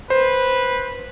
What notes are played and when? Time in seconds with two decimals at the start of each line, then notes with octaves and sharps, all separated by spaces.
0.10 B4 C5